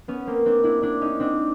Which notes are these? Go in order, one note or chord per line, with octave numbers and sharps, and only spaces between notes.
B3 C#4
A#3 C4
C4 D4
D4 E4
D4 E4
C#4 D#4
C4 D4